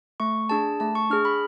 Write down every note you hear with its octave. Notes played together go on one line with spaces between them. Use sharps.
A3 C#6
D4 G#4 A5
A3 A5
C#6
D4 G#4 F6
B5